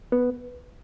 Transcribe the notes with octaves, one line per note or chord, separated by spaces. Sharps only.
B3